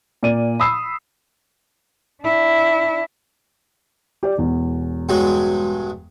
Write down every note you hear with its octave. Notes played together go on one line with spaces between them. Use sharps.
A#2 D5 D#7
B5 D#6 E6 C7
D4 E4
G4 D5
E1 E2
G2 F#3 G#3